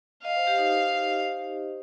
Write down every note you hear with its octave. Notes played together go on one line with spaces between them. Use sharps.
D#5 F5
C5
G4
D#4
D#4